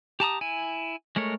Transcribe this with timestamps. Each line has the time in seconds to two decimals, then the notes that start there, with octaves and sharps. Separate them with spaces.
0.20 G4 A5 A#5 D#6
0.41 E4 G#5
1.16 G#3 A3 A#4 C#5